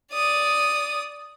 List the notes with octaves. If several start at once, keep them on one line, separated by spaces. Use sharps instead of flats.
D5 D#6